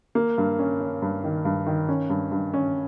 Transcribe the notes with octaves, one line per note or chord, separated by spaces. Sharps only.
A#3
G2
C#4
C#4
G2
D#3
G2
D#3
C#4
G2
G2
C#4